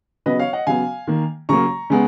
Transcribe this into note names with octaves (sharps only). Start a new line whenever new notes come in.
C#3 F#3 B3 B4 D#5
C#5 F5
D#5 F#5
C#3 F#3 B3 F5 G#5
D#3 A#3
C#3 F#3 A#3 A#5 C#6
C#3 G#3 B3